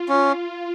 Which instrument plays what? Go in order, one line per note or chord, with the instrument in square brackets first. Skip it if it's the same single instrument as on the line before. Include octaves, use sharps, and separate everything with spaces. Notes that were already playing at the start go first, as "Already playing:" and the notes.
Already playing: [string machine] F4
[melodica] C#4